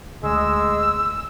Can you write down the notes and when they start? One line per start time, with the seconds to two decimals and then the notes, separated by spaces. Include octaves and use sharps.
0.24 D2 G#3 E6